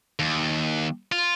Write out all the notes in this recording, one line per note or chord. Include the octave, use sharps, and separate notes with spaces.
D#2
F4